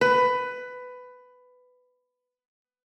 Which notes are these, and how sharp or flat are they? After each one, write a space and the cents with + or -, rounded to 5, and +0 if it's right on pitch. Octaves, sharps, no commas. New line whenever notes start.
B4 +15